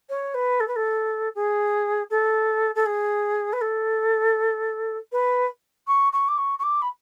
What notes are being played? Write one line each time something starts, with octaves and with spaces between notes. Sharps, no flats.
C#5
B4
A4
B4
A4
G#4
A4
A4
G#4
B4
A4
B4
C#6
C#6
D6
C#6
C#6
D6
B5